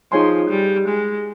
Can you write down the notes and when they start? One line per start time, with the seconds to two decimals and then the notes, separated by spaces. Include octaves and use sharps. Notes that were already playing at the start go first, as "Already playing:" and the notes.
0.12 F3 D#4 G#4 C#5 G#5 C6
0.50 G3
0.88 G#3